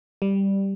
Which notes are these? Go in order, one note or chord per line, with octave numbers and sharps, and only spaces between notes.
G3